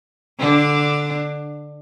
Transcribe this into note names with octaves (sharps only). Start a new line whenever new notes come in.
D3 D4